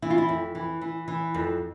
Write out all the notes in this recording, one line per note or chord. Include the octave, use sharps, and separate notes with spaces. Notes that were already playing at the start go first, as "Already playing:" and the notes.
E3 E4
F4
E4
F2
E3
E3
E3
F2